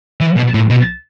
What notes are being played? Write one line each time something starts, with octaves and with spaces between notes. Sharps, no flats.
E3
B2
A2
B2